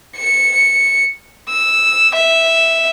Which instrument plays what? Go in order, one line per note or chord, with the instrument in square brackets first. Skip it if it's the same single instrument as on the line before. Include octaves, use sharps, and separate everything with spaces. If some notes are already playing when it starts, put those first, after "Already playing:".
[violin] C#7
E6
E5